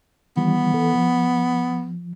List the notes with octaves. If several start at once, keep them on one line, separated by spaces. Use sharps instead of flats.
D#3 E3 G3 B3
E3 A4
F3